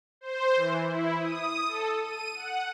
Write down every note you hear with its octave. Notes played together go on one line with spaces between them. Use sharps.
C5
E3
E4
D#6
A4
D#7
F#5